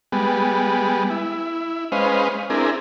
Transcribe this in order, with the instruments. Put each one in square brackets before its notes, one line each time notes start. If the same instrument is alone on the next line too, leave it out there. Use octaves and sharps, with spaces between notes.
[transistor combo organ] G3 G#3 B3
E4
G#3 C#4 B4 C5 D#5 F5
C4 D4 E4 G#4 A#4